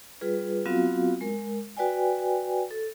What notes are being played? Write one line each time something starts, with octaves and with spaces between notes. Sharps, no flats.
G3 F4 G#4 B4
F#3 B3 C4 F4 F#4 F5
G#3 A#4
F#4 B4 D5 G5 G#5
A4